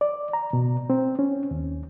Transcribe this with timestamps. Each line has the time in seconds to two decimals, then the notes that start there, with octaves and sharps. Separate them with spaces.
0.01 D5
0.33 A#5
0.53 B2
0.90 C4
1.19 C#4
1.51 D#2